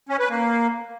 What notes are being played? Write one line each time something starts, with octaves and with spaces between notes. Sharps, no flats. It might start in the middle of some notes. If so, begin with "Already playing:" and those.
C#4
B4
A#3